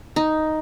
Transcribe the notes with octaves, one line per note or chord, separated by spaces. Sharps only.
D#4